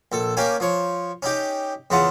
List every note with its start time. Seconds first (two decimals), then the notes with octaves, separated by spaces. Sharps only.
0.12 A#1 A4
0.37 A#3 C#4 G4 G#5
0.60 F3 C#5
1.23 C#4 D#4 G4
1.90 E2 C#3 F4 F#5 A5